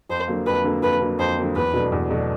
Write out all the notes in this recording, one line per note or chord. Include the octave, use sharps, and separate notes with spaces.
F2 C5
D3 F#3 A#3
F2 B4
D3 F#3 A#3
F2 B4
D3 F#3 A#3
F2 C5
D3 F#3 A#3
E2 B4
B2 F#3 A3 D4
E2
B2 F#3 A3 D4